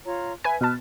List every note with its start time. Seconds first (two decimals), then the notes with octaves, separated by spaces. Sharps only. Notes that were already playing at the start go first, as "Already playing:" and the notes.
0.04 F4 C#5 A#5
0.44 B4 E5 G#5
0.61 B2 B4 A5 F6